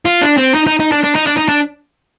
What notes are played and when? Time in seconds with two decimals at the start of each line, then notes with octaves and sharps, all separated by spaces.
0.06 F4
0.22 D4
0.38 C4
0.55 D#4
0.67 D#4
0.80 D#4
0.92 D4
1.03 D4
1.15 D#4
1.27 D4
1.37 D#4
1.49 D4